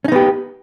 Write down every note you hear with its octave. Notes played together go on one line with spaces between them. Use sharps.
B3 C#4 D#4 G4